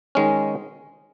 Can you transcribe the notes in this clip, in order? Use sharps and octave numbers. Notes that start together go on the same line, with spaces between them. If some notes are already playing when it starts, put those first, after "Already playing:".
D#3 G#3 C#4